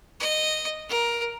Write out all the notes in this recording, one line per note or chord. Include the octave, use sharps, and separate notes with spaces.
D#5
A#4